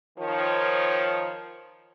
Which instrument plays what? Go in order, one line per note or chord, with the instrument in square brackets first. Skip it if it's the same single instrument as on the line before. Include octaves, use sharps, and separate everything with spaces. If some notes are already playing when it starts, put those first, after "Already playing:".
[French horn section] D#3 F3 C#5